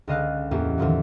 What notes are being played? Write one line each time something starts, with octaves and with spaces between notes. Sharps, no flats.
C#2 D3 D#5 F5 F#6 A6
E2 A2 A#3 C#4 G4
E2 A2 D3 D#3 F3 F#3